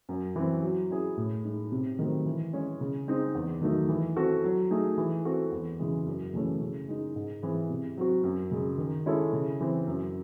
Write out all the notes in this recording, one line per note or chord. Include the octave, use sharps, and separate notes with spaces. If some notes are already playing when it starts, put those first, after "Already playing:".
F#2
E3 C4
F#3
C#4 E4 G#4
A2
G#3 D#4
C3
D#3 F#3 A3 C4
E3
G#3 C#4 G#4
C#3
G#3 C4 D#4
E2
D#3 F#3 A3 D#4
E3
C4 F#4 A4
F#3
A3 D#4 G#4
E3
C4 F#4 A4
E2
C#3 E3 G#3
F#2
C#3 E3 A3 C#4
C#3
G#3 D#4
G#2
E3 C4 E4 G#4
C3
F#3 C4 F#4
F#2
C#3 G#3
D#3
G#3 C#4 E4 A4
C#3
E3 C4
F#2